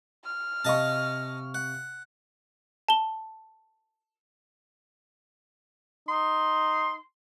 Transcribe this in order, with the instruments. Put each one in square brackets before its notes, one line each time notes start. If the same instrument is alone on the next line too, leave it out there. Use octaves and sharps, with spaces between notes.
[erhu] F6
[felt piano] C3 F5 C#6 [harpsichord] D#5 A5
[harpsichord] F#5
[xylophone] A5 G7
[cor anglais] D#4 [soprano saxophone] C6